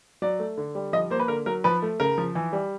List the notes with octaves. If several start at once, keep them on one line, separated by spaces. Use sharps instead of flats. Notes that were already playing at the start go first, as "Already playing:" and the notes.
F#3 D5
A3
D3
G3
F3 D#5
A#3 C5
B4
D3 A#4
F#3 A#4
F3 B4
A3
C#3 A#4
F3
E3
G3